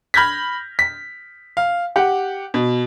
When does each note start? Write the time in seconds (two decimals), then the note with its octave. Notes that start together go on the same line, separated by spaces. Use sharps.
0.14 B5 F6 G6 G#6 A#6 B6
0.79 B6
1.57 F5
1.96 G4 F#5
2.54 B2